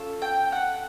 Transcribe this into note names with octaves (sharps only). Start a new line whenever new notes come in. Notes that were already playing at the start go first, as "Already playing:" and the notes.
Already playing: C#4 F4 A4
G5
F#5